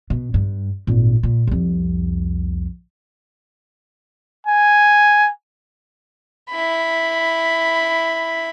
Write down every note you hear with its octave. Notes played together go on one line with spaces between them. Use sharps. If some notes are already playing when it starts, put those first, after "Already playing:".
B2
G2
G#1 A#2
A#2
C2 F2
G#5
E4 B5